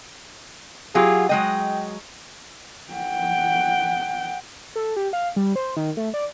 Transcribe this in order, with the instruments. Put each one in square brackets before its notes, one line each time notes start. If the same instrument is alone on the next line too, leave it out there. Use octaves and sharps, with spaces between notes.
[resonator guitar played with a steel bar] F#3 F4 G4 [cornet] G#4
[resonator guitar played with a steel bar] F#3 G#3 D#5 [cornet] G5
[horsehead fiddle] F#5 G5
[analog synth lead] A4
G4
F5
G3
C5
D#3
A3
D5